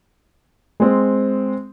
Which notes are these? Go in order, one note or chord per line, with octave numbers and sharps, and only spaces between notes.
G#3 C4